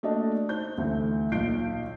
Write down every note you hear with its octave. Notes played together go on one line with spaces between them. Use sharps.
A3 A#3 D4 F#4 D#5 A5
D#4 C5 G6
D2 E3 A3
B1 A#2 F4 G6 C7 D7